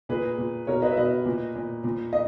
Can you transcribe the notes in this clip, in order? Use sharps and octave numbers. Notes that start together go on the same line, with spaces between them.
A#2 G#4 B4
A#2
B2 A#4 C#5
B4 D#5
E5
B2 B4 D#5
A#2
A#2
A#2
D#5